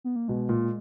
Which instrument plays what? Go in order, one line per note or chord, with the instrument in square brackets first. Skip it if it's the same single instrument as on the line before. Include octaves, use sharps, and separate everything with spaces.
[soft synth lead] B3
A#3
[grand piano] B2 [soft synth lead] G#3
[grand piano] A#2